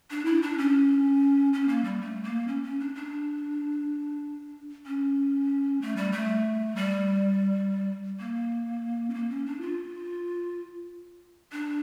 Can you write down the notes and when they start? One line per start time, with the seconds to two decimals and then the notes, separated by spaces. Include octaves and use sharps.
0.11 D4
0.25 E4
0.42 D4
0.58 C#4
1.53 C#4
1.68 A#3
1.84 G3
2.01 A3
2.24 A#3
2.48 C#4
2.63 C#4
2.80 D4
2.95 D4
4.86 C#4
5.82 A3
5.96 G3
6.12 A3
6.76 G3
8.19 A#3
9.10 C#4
9.14 A#3
9.30 C#4
9.46 D4
9.61 F4
11.52 D4